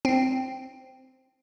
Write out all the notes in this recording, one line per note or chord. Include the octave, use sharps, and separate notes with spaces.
C4